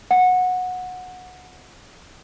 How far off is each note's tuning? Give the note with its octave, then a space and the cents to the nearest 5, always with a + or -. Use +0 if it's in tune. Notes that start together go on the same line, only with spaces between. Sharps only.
F#5 -15